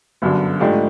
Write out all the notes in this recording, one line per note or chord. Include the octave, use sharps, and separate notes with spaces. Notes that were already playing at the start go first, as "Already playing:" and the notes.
G1 F#2 D3
G#2 F3 A3 D4 G4